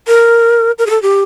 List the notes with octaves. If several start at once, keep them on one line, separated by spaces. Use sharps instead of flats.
A#4
A#4
G#4
A4
G4